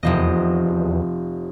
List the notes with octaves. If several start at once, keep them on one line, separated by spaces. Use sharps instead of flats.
F1 E2 F3 D#5